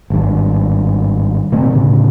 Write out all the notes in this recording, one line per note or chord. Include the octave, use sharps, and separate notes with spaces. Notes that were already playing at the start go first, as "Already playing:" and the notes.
G#1 G2
B2 E3 A3 C4
D2 A2 C#3